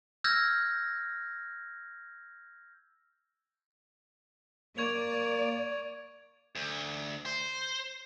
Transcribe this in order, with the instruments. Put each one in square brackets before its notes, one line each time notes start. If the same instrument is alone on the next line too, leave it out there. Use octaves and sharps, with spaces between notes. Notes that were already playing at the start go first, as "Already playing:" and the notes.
[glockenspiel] E6 F6 G6 G#6 A#6
[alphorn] A#3 [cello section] D5 [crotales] C#6 G#6 F7
[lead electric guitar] D2
C5